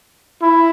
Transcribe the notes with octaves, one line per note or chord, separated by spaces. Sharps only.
E4